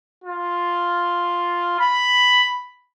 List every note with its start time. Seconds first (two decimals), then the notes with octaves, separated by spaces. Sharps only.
0.24 F4
1.80 B5